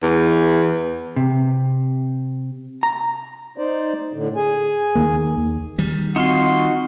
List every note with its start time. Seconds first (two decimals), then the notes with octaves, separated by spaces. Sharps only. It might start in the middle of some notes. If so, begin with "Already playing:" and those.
0.02 E2
1.16 C3
2.83 A#5
3.58 D#4 C5 D5
4.13 A2 D3
4.36 G#4 G#5
4.95 D#2 D#3 A#3
5.37 D#2
5.78 D#3 G3
6.16 C4 D#4 F4 F#4 C6